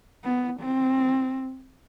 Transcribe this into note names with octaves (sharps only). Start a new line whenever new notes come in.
B3
C4